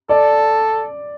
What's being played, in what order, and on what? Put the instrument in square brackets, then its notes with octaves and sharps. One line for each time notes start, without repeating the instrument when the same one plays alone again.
[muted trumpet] A4 [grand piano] D5